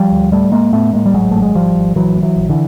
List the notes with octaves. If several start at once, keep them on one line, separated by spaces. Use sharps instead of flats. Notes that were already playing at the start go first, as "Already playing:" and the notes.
Already playing: F3 G3
D2
A2 G3 A3
A2 G#3 A#3
A2 A3 B3
A2 G#3 A#3
G3
G#1 F#3 G#3
G#1 A3
G#3
G#1 F3 G3
G#1
A#1 E3 F#3
A2
E3 F#3
A#1
D3 E3